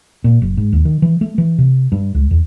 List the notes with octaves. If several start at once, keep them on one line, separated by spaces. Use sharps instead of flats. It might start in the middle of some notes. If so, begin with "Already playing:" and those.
A#2
F#1
G#2
D#2
D#3
E3
A3
E3
C3
G2
C#2
E2